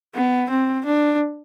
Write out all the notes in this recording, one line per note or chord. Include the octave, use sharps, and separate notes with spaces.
B3
C4
D4